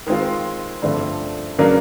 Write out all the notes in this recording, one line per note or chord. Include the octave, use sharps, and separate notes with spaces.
D#3 G#3 C4 F4
G2 D3 F3 A3 C4
C#3 F#3 A#3 D4